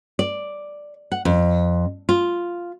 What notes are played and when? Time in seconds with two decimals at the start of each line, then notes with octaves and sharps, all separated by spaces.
0.19 D5
1.12 F#5
1.25 F2
2.09 F4